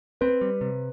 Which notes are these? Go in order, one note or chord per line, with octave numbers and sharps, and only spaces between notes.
C4 B4
G3
C3